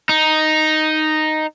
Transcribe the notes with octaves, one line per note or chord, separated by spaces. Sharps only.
D#4